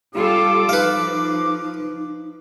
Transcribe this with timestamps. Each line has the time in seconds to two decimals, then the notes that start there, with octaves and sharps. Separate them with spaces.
0.14 G3 F4 G4 A4 D6
0.69 F3 D#4 B4 F5